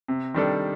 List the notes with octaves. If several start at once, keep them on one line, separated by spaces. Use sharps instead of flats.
C3
D#3 G3 D4 A4